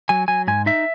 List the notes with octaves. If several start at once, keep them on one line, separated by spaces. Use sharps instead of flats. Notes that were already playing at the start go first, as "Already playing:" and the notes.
F#3 G#5
F#3 G#5
G#2 G#5
D#4 E5